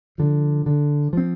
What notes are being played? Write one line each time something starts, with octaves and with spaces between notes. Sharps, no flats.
D3 F3
D3
F3 C4